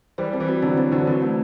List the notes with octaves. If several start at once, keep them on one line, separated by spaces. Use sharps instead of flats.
E3 G3 C5
C4
E3
F#4
D3 F#3 C4
C5
D3 F#3 C4
E3 F#4
A3